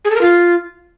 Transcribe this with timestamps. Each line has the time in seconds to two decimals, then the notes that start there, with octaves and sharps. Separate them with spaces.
0.05 G#4
0.10 A4
0.16 A#4
0.21 F4